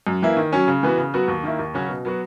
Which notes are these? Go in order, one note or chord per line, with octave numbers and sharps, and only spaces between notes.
F#2
E3 A#3 E4
D#3
F#3 C#4
C#3
E3 B3 F#4
C#3
F#3 B3 F#4
D#2
D#3 A#3 E4
D#2
C#3 F#3 C#4 F#4
B2
F#3 B3 F#4